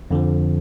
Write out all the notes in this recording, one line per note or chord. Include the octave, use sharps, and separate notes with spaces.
F2 D3 F3